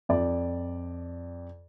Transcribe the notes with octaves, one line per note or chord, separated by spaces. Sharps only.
F2 D5